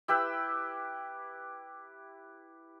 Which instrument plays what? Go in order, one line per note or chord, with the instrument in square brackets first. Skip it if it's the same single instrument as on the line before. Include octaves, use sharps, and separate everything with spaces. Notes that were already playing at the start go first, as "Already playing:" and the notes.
[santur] E4 G4 B4 E6